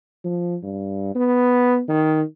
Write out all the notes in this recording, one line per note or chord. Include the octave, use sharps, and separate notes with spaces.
F3
G2
B3
D#3